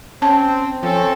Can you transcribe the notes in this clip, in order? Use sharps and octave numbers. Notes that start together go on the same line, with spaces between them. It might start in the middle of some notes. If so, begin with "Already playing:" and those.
C4 C#4 A5
F3 C4 C#4 A4